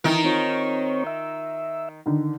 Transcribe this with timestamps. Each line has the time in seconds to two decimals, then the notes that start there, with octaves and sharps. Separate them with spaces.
0.04 D#3 E3 D#4 A#4
0.24 C4 F4 C#5
1.07 E5
2.06 D3 D#3